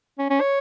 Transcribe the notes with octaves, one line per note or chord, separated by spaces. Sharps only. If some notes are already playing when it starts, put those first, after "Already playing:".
C#4
C#4
C#5